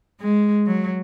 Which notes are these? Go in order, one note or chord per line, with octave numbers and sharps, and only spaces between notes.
G#3
F#3